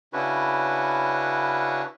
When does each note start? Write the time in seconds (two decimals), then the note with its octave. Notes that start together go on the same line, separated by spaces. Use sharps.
0.13 C#3 C#4 D4 E4 F#4 B4